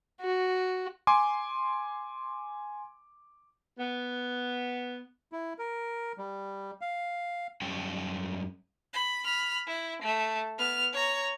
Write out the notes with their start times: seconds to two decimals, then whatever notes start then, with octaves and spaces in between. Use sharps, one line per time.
0.21 F#4
1.07 G#5 C6 D6
3.78 B3
5.32 E4
5.59 A#4
6.18 G3
6.81 F5
7.61 F#2 G3 C#4 G5
8.93 B5
9.24 B5 F6
9.67 E4
10.02 A3
10.58 B3 F6
10.93 C#5 A#5